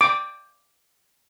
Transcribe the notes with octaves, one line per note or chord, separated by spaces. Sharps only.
D6